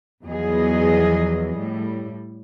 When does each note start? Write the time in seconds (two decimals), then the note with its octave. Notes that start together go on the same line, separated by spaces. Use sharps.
0.24 E2 F3 F#3 B3 G#4 D#5
1.57 A2 G3